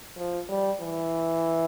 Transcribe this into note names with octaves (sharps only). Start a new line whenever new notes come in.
F3
G3
E3